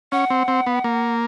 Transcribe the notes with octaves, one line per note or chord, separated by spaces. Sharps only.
C#4 F#5
C4
C4
B3
A#3